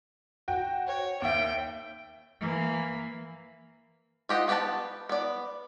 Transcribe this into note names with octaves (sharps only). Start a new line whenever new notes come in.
F#4 G5
C#5
D#2 E5 G5
E3 A#3
F4 G4 D#5 F#5
B3 G4 B4 F#5 A5
B3 D5